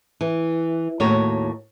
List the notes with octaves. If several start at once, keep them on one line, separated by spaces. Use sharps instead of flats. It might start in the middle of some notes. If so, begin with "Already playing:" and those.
E3
D#2 A2 F#4 A#4 C#5